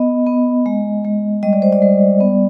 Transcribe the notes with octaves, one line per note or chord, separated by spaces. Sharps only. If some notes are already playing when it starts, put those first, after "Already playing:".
Already playing: B3 D#5
B3
G#3
G#3
G3 D#5
D5
C5
D5
G3
B3